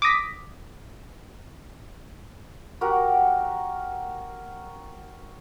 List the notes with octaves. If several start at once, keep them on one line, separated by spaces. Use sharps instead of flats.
D6 D#6 A#6 B6
F#4 G4 A#4 F#5